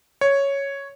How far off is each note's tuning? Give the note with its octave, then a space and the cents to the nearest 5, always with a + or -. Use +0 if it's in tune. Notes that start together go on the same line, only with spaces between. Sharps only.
C#5 +0